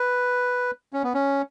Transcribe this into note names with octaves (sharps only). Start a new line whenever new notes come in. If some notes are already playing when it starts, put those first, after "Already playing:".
Already playing: B4
C#4
B3
C#4